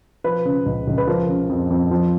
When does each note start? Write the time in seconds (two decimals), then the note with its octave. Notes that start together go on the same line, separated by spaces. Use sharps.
0.24 F3 B4
0.45 C#3
0.66 C#2
0.87 C#2
0.98 B4
1.07 F3 A#4
1.29 C#3
1.49 F2
1.70 F2
1.91 F3